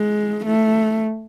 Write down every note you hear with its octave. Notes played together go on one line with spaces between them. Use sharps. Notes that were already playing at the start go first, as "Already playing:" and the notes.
Already playing: G#3
A3